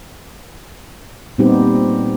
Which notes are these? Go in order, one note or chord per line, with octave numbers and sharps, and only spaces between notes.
A#2 G3 B3 C4 D#4 G4